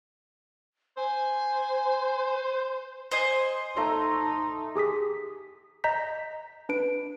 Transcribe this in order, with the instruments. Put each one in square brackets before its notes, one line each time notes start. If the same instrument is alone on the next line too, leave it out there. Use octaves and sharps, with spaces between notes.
[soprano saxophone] C5 [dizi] G#5
[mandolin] C5 D#5 G#5
[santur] A3 A#5 C6 [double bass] D#4
[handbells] G4 G#4 D#6 B6
D#5 A#5 G6 B6
D4 B4 D7